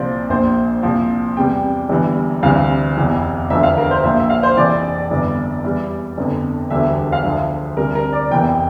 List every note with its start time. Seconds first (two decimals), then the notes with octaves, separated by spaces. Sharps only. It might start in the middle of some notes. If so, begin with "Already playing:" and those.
Already playing: C2 A#2 F3 C5 D5
0.30 A#1 A#2 F3 C5
0.83 C2 A#2 F3
1.37 E2 C3 G3 G5
1.89 G1 G2 E3 G3
2.43 D2 C3 E3 G3 F5
2.97 F1 E2 E3
3.50 E1 D2 D3 F3 E5
3.63 F5
3.78 A#4
3.91 C5
4.03 A#1 A#2 F3 E5
4.19 E5
4.30 F5
4.43 C5
4.57 F1 F2 E3 D5
5.11 G1 G2 E3 G3
5.64 E2 E3 G3
6.18 G1 F2 D3
6.70 E1 D2 D3 G3 E5
7.12 F5
7.24 D2 D3 F3 E5
7.77 D2 C3 G3 A#4
7.95 A#4
8.13 D5
8.31 F1 E2 E3 G5